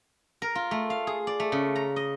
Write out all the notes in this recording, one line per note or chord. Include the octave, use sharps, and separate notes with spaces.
A#4
F4
A3
F5
G#4
D5
A3
C#3
A#5
D#5